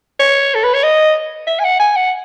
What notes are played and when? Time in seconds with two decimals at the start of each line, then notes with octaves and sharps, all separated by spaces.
0.19 C#5
0.55 A4
0.64 B4
0.74 C#5
0.83 D#5
1.47 E5
1.59 G#5
1.64 F#5
1.79 G#5
1.96 F#5